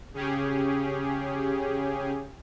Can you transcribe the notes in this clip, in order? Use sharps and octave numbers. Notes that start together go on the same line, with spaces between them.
C#3 C#4 G4 G#4